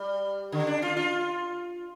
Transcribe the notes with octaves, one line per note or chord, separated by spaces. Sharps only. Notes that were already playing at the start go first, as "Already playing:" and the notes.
Already playing: G3
D3
D4
F4
F4